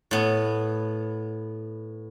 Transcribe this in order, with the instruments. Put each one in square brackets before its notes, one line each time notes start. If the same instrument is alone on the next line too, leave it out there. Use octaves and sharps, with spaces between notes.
[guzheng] A2 B3